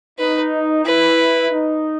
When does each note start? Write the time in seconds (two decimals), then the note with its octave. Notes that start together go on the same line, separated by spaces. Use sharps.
0.19 D#4 B4
0.85 E4 B4
1.52 D#4